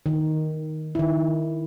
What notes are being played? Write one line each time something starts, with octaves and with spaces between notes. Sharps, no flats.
D#3
D#3 E4